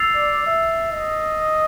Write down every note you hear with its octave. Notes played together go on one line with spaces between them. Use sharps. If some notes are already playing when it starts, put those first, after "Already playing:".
Already playing: E6 A6 C7 F7
D5
E5
D#5